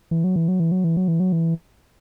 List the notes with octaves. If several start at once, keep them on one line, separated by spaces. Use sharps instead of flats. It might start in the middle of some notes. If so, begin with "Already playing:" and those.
E3
F#3
E3
F#3
E3
F#3
E3
F#3
E3
F#3
E3